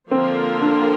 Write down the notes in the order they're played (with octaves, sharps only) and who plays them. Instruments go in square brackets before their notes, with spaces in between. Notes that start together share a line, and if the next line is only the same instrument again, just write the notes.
[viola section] D3 F3 A#3 F4 A#4 [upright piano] C4
[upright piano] D4